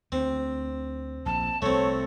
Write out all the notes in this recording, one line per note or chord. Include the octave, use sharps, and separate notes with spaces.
D2 C4
A#1 A5
C2 A3 C4 C#5